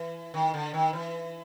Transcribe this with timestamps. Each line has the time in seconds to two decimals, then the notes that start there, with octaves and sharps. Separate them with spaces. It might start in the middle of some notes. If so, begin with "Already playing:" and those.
Already playing: E3
0.34 D#3
0.54 D3
0.74 D#3
0.93 E3